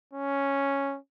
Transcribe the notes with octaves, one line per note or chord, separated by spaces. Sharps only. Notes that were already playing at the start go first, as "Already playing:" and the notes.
C#4